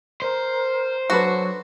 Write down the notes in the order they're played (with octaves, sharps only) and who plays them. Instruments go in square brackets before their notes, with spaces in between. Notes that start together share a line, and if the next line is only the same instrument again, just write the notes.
[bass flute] A#4 [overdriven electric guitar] C5
[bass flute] F#3 [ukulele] D4 A4 B4 [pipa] F#4